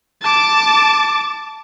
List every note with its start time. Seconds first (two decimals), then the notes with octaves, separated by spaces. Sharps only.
0.21 A5 D6